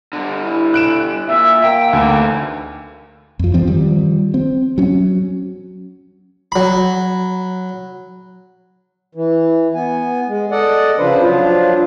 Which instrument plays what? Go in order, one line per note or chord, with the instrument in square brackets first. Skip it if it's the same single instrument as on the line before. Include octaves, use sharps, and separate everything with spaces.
[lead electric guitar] G2 D3
[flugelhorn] E4
[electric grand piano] F#6 D7 E7
[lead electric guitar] A#2 [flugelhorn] E5
[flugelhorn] A#3 [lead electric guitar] G5
[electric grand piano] D2 [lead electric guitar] D3 E3
[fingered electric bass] F2 F3
G2 E3 F3 C4
D#3 F3 G3
C4
F#3 C#4
[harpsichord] F#3 B5
[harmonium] E3
B3 G#5
G#3
A4 D5 D#5 F#5
C#3 F3 D4 B4 C5
F3 F#3 D4 F4